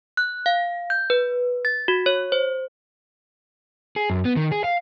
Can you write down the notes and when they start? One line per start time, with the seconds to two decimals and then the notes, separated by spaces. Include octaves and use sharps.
0.17 F#6
0.46 F5
0.90 G6
1.10 B4
1.65 A6
1.88 F#4
2.06 C#5
2.32 C5
3.96 G#4
4.10 F#2
4.25 B3
4.36 D#3
4.52 G#4
4.64 F5